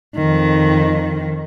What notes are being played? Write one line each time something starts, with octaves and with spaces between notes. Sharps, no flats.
F2 D#3